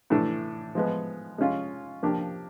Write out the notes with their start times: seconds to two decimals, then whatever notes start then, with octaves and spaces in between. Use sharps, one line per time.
0.10 A2 E3 A3 D4
0.75 F3 G#3 B3
1.38 G#3 C#4 F4
2.03 F3 A#3 D4 G4